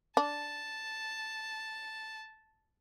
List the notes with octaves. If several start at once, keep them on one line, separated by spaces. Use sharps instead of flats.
D4 A5